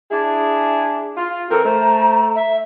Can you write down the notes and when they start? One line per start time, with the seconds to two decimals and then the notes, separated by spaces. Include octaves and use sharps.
0.12 D4 E4 G#4
1.17 F4
1.51 E3 C4 A4 A#4 A#5
1.65 A3 C5
2.36 E5